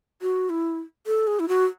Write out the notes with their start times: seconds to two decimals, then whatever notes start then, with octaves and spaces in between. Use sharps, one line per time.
0.22 F#4
0.50 E4
1.06 A4
1.27 G#4
1.40 E4
1.49 F#4